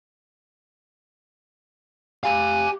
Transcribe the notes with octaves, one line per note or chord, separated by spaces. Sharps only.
G4 F5 G#5